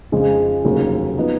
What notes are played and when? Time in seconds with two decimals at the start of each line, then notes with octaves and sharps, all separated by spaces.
0.12 F2 C#3 F3 G#3
0.64 F1 D#2 C#3 F#3
1.18 F3 B3 D#4